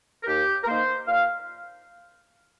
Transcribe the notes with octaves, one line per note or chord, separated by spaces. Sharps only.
A#4
D#2 G4
A#4
D#3 A#3 C5
A#2 F5